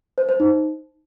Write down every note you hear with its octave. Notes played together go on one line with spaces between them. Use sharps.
C5
C5
D#4